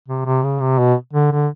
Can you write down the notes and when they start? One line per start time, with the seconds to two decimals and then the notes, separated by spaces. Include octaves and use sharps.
0.08 C3
0.26 C3
0.43 C#3
0.61 C3
0.78 B2
1.13 D3
1.32 D3